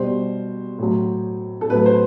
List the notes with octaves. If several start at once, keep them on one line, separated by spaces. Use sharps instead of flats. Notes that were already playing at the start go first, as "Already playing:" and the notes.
Already playing: B2 G3 C5
A2 F#3
A4
A2 F#3 B4
C5